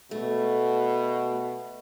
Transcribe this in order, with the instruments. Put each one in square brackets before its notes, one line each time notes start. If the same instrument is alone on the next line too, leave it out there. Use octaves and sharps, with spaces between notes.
[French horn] B2 [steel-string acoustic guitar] A3